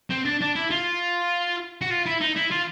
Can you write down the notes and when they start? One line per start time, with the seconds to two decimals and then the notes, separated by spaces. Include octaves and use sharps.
0.10 C4
0.26 D4
0.41 D4
0.56 E4
0.71 F4
1.81 F#4
1.91 F4
2.06 E4
2.21 D#4
2.36 E4
2.51 F4